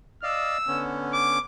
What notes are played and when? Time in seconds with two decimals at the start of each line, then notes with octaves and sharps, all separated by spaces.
0.23 D5 D#5 F5 E6
0.67 D3 B3 C#4
1.13 D6